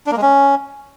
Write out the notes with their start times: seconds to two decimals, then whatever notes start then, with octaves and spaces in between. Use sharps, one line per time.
0.06 D4
0.11 A#3
0.16 G#3
0.22 C#4